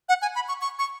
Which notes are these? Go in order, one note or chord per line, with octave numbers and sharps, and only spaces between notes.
F#5
G#5
B5
C#6
C#6
C#6